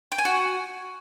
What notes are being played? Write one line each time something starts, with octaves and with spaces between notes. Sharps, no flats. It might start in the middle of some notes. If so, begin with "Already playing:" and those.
G5
G#5
F#4